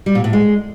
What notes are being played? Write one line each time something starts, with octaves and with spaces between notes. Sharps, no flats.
G3
A#2
A2
G#3